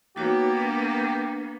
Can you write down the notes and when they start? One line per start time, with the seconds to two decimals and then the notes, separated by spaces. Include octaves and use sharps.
0.16 A#3 B3 D#4 F#4 G4 C#5
0.59 D4 G5